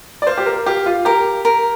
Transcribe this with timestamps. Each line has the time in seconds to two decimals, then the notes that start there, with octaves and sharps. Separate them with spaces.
0.22 D5
0.27 C5 F5
0.37 G4
0.46 A#4
0.66 G4 F5
0.86 F4
1.05 G4 A#4
1.45 A#4